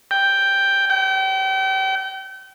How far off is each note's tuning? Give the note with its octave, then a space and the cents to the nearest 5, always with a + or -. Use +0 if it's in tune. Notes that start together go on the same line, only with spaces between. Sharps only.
G5 +5
G5 -35